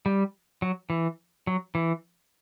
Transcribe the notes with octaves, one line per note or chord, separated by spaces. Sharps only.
G3
F#3
E3
F#3
E3